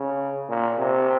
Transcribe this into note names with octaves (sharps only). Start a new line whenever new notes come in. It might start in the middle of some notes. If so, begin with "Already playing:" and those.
Already playing: C#3
A#2
C3